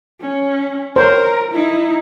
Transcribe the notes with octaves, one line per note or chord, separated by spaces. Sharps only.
C#4
A#4 C5 C#5 C6
D#4 E4